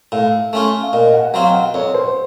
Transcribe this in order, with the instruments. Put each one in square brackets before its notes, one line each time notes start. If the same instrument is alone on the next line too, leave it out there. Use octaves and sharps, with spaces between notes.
[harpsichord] A2 [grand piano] F5
[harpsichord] A3 C#4 F4
[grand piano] F5
[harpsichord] A#2 [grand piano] D#5
[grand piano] F#5
F#5
[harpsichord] F#3 C4 F4 [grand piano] F5
[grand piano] F#5
[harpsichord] F2 [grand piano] C#5
[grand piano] C5